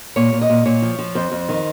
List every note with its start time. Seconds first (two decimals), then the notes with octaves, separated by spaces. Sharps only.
0.16 A#2 C#5
0.33 A#2
0.41 D#5
0.50 A#2
0.66 A#2 C#5
0.82 F3
0.99 F3
1.15 F2 C5
1.32 F2
1.49 D#3